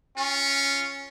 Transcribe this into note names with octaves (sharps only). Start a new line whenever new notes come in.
C#4 F4